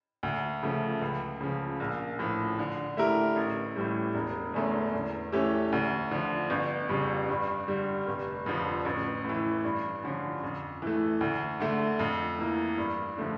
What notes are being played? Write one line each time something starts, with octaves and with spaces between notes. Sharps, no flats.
D2
C#3 F3 A3
C#2
C#3 F3
A#1
A2 F3
D3
A3 E4 G4 A#4
A1
A2 E3 G3
E1
E2 D3 A3 C#4
E2
E3 A3 C#4 G4
D2
D3 F3
G1
F2 C#3 G3
G2
D3 G3
F1
F2 D3 F3
A1
A2 E3
G2
D3 F3 C#4
F2
E3 A3
D2
D3 A3
F2
E3 A#3
G2
D3 F3 A3 D4